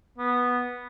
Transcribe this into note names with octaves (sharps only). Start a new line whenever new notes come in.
B3